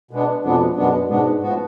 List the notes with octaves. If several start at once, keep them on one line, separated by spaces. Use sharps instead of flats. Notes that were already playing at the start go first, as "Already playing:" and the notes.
B2 G#3 B3 D4
F2 B2 G#3 B3 D4
F#2 B2 G#3 B3 D4
G#2 B2 G#3 B3 D4
A2 F3 B3 F#4